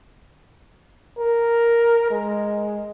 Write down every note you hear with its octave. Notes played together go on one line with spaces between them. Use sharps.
A#4
G#3